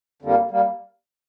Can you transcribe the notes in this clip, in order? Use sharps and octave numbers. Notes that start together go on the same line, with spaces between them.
F2 D3 G3 A#3
G3 A#3